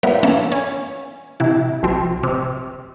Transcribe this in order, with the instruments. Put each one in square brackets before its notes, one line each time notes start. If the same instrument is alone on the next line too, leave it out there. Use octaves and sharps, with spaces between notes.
[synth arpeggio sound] F3 G3 B3 E4 A#4
E3 A#3 B3 C#4 A4
C#4
C3 E3 E4
B1 C3 F3 C4
C3